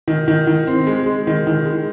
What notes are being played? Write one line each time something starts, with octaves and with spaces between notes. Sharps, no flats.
D#3
D#3
D#3
C4
G#3
G#3
D#3
D#3
G#3